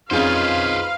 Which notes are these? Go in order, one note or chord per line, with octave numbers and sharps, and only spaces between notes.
F2 C#4 D#4 F4 G#4 B4 C5 F5